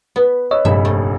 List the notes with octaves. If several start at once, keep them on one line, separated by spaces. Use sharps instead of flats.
B3 B4
B4 C#5 D#5 E6
F1 A#1 G2 E5 B5
A3